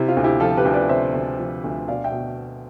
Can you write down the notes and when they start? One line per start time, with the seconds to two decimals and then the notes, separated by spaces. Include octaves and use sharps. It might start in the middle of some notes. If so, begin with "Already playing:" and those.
Already playing: C3 E4
0.08 F4
0.17 D2
0.24 E4 G4
0.40 F3 F4 A4
0.57 G4 B4
0.65 D2
0.74 B4 D5
0.89 C3 C5 E5
1.14 D2
1.39 F3
1.64 D2
1.88 B2 D5 F5
2.04 E5 G5
2.12 B2